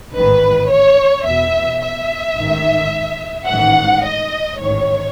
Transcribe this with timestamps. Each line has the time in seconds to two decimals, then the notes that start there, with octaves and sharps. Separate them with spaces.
0.15 A1 G#2 D#3 B4
0.70 C#5
1.26 E2 B2 E5
1.81 E5
2.36 A1 G#2 D#3
3.48 A1 G#2 D#3 F#5
4.03 D#5
4.59 A1 G#2 D#3 C#5